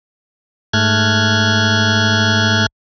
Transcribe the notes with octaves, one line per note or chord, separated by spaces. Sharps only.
G#2 A3 F6 F#6 G#6